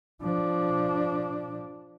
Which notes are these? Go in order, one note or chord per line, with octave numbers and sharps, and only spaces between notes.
F3 D4